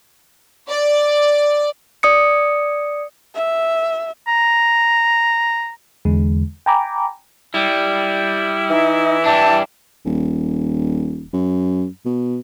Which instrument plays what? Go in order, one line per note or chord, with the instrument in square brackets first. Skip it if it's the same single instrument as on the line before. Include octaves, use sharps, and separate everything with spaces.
[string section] D5
[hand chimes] D5 D#6 C#7
[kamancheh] E5
[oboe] A#5
[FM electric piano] E2 D3 G#3
G5 G#5 A#5 B5 D6
[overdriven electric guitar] G3 [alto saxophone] E4
[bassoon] E3 [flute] D#4
[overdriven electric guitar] G3 D4 [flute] A5
[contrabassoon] D#1
F#2
B2